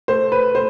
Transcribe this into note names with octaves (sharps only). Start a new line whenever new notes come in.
A3 C5
B4
A3 C5